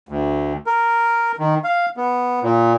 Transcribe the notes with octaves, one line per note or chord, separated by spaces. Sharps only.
D2
A#4
D#3
F5
B3
A#2